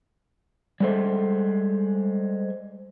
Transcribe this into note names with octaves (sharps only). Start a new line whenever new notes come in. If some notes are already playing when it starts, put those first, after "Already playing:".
G3 G#3 A4 C5 E5